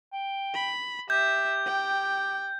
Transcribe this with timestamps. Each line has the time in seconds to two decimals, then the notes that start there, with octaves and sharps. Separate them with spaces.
0.13 G5
0.54 B5
1.10 G4 E5 G6
1.66 G5